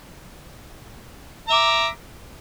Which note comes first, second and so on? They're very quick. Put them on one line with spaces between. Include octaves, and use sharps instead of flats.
A#5 E5 D6